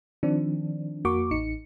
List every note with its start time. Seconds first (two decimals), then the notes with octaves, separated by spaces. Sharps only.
0.23 D#3 F3 C4 D4
1.05 F2 A#3 F#4 A#4 C#6 D6
1.31 A1 D#4 C#7